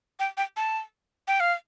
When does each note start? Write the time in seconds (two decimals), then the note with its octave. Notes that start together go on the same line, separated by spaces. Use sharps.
0.20 G5
0.37 G5
0.57 A5
1.28 G5
1.40 F5